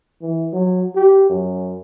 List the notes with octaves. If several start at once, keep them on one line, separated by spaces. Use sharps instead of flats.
E3
F#3
G4
F#2